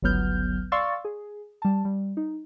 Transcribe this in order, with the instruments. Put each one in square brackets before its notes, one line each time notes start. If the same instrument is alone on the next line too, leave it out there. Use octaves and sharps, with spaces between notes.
[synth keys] G1 C#2 F#3 B3 F6 G6
D5 F5 C6 C#6 E6 A6
G#4
G3 A5
G3
D#4